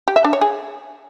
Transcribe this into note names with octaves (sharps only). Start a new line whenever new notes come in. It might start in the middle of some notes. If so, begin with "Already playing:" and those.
G4
E5
D4
C#5
G#4